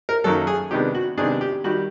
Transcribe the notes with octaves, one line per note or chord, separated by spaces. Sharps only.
A#4
F#2 D#3 F#3 A#3 A4
G#4
C3 D#3 G#3 B3 D4 G4
F#4
C3 D#3 G#3 B3 D4 G#4
G4
D#3 G3 F#4